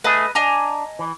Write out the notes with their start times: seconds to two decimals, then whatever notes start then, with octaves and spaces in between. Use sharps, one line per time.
0.04 A3 G#4 B4 D#5
0.35 D4 D#5 G#5 A#5
0.99 E3